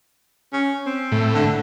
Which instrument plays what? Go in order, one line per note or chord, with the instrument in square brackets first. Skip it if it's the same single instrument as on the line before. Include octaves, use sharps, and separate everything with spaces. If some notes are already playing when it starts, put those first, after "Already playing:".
[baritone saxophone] C#4
C4
[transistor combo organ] A2
[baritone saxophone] D3